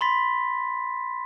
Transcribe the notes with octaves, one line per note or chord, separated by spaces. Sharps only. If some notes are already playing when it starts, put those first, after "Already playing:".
B5 C6 A6 B6